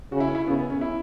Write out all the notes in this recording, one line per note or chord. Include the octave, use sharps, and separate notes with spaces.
C#3 F#4
E4
C#4
E4
C#3 B3
B3
C#4
E4